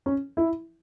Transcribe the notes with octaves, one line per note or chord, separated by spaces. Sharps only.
C#4
E4